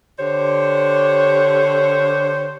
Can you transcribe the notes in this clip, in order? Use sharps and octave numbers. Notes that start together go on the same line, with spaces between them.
D3 G4 C5 C#5